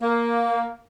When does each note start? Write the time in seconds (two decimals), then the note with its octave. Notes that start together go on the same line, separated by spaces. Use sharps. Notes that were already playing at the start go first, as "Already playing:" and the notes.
0.02 A#3